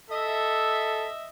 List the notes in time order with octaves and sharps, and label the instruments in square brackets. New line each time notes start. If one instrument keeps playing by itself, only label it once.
[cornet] A4 [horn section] D#5 E5